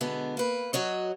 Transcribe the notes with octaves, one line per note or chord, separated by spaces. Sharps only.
B2 D3 G#3 B3
A#3 B4
F#3 F#4 C#5 D#5